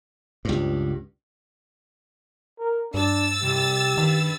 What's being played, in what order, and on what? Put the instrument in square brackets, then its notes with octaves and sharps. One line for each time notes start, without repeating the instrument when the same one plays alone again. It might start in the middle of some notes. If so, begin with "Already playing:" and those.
[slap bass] C#2 G2
[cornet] A#4
[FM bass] G2 [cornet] D4 [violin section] E6 A6
[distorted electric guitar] C2 [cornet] G4
[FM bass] D#3 [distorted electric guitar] D4 B4